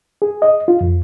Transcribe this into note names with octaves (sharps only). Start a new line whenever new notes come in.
G#4
D#5
F4
F2